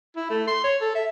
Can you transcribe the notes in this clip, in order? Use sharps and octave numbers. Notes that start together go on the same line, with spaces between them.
E4
A3
C6
C#5
A4
E5